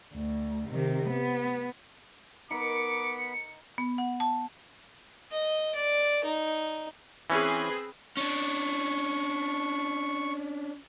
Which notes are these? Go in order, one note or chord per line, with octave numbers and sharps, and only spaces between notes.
D2
C3 D#3
B3
B3 D#4 A#4 B5 D6 C#7
B3
F#5
A5
D#5
D5
D#4
E3 C4 C#4 G#4 B4
C#4 D4 C#6